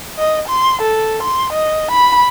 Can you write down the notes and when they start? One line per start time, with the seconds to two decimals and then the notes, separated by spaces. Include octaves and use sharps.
0.18 D#5
0.48 C6
0.82 A4
1.23 C6
1.53 D#5
1.91 B5